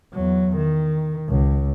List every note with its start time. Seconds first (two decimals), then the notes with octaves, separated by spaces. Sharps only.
0.13 E2 F#3
0.57 D#3
1.29 C#2